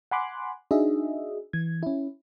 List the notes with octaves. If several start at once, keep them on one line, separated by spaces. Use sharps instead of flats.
F#5 G#5 B5 C6 D6 F#6
D4 D#4 F#4 G#4 D#5 E5
E3 G#6
C#4 E4